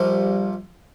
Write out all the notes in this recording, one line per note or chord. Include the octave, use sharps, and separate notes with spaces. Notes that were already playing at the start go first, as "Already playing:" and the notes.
Already playing: A#1 A#2 F3 G3